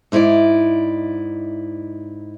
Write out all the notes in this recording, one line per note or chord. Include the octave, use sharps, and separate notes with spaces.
G#2 D#4 E4 C5 D5